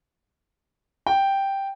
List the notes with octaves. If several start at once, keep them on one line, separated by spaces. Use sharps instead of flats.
G5